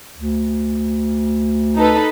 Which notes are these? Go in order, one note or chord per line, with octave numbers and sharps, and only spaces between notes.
D2
D#4 A4 B4